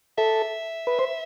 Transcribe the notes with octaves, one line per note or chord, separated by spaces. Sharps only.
A4 E5
B4
C5